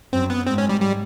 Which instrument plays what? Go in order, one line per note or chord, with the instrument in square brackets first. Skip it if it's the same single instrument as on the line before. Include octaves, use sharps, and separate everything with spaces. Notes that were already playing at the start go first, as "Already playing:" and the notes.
[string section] F#2 [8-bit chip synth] C4
[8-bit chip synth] B3
[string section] G#2 [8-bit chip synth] C4
[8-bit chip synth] C#4
G3
G3